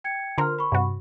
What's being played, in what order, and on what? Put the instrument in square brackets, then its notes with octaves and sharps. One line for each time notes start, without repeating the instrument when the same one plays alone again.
[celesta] G5 G#6 C#7
[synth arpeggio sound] D3 A#4 C5 [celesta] F4 C6 F6
[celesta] B5 C#6
[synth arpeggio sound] G2 C3 F#4